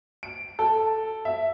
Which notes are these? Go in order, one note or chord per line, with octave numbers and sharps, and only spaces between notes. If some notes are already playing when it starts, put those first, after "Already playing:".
D7
A4
E5